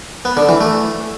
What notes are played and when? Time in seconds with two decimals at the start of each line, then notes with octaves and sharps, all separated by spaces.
0.25 B3
0.37 D3
0.49 E3
0.61 A3